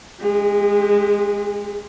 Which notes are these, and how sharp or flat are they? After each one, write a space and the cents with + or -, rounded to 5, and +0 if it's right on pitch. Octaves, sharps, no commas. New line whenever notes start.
G#3 +0 G#4 -40